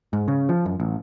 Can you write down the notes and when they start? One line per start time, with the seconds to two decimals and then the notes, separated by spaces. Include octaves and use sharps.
0.13 G#2
0.28 C#3
0.49 F3
0.65 F#2
0.80 A1